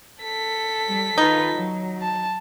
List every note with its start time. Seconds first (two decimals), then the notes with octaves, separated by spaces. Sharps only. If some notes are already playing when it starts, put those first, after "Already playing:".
0.22 A4 B6
0.87 G3
1.18 D#3 D#4 F4 B4
1.52 F#3
2.02 A5